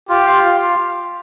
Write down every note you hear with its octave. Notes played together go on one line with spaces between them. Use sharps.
F4 G4
F5
F4